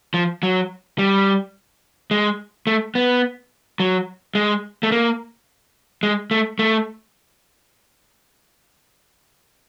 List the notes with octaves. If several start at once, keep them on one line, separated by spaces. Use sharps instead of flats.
F3
F#3
G3
G#3
A3
B3
F#3
G#3
A3
A#3
G#3
A3
A3